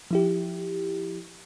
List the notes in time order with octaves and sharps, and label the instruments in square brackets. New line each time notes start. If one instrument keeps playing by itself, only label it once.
[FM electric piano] F3 E4 G4